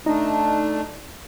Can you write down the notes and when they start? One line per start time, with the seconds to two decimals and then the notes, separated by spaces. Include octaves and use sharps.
0.06 A3 D4 D#4